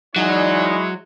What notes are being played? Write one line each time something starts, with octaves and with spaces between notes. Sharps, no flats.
E3 F#3 G#3 D#4 E4 A#4 C#5 D5